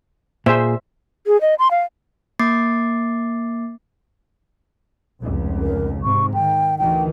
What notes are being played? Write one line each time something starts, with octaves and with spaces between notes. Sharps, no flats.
A#2 G#4 C5 E5
G#4
D#5
C6
F5
A#3 D6 A6 C7
F1 C#2
A#4
G#2 C3 C#6
D#3 G5
D2 D#3 E3 G5